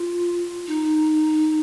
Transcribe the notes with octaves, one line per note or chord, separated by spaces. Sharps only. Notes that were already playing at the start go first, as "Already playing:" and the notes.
Already playing: F4
D#4